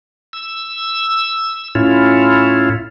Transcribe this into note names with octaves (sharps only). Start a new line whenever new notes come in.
E6
A2 C#4 E4 F4